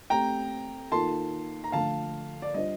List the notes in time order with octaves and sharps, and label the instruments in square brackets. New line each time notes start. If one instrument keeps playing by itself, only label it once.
[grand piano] A3 C4 G4 [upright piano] G5 A#5
[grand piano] D#3 A#3 F4 A4 [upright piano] A5 C6
[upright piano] A#5
[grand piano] D3 F3 A3 D4 [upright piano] F5 A5
[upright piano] D5
[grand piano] G3 D4 F4 C5 [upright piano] D#5